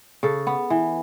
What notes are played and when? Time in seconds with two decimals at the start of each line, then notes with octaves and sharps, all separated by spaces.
0.23 C#3 A4
0.47 B3
0.70 E3